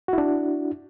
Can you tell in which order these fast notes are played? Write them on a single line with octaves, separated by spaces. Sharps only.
F#4 E4 D4